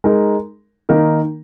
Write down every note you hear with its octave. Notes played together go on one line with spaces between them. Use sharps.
G#3 D#4 A#4
D#3 A#3 D#4 A#4